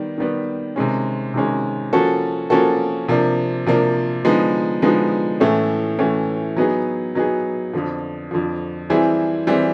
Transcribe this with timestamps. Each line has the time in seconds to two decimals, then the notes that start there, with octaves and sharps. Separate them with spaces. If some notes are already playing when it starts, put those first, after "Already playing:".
Already playing: D#3 G3 B3
0.18 D#3 G3 B3
0.76 C3 D#3 G#3 C#4
1.34 C3 D#3 G#3 C#4
1.93 F3 A#3 C#4 F#4 A4
2.50 F3 A#3 C#4 F#4 A4
3.08 C3 F3 A#3 D4
3.66 C3 F3 A#3 D4
4.25 D3 F3 G#3 B3 D#4
4.82 D3 F3 G#3 B3 D#4
5.40 A2 E3 A3 C#4
5.99 A2 E3 A3 C#4
6.57 F#3 B3 D#4 G#4
7.15 F#3 B3 D#4 G#4
7.73 F2 D3 F3
8.31 F2 D3 F3
8.90 E3 G3 C4 E4 G#4
9.47 E3 G3 C4 E4 G#4